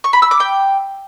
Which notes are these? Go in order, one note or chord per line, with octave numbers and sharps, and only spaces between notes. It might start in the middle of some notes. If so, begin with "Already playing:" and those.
C#6
B5
E6
D6
G5